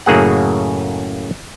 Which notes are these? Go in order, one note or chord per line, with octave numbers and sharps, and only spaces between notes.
F#2 A2 C#3 A#3 G#4 F#5